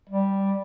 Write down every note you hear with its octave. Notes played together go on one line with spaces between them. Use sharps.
G3